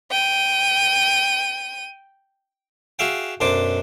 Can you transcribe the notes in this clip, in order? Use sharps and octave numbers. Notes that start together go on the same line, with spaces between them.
G5 D#7
F#4 G#4 E5 F5 G5
B1 F#2 D4 C5 D6